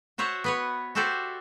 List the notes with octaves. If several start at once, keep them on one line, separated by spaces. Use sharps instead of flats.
F#4 C5 C#5 E5 F#5
B3 B4 C#5
F#4 G4 A4 C5 D5 E5